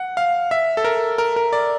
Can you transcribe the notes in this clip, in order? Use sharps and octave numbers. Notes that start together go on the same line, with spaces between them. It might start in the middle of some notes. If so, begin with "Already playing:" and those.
Already playing: F#5
F5
E5
A4
A#4
A#4
A#4
D5